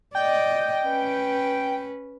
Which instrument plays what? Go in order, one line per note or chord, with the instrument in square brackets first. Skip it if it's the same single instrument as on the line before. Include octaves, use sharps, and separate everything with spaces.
[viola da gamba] D5 D#5 [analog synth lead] G5
[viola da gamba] C#4 B4